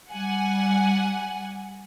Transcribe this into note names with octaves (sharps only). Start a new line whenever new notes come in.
G3 F#5 G#5